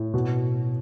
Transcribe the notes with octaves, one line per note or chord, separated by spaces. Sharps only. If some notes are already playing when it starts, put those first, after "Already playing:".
Already playing: A2
B2 F#4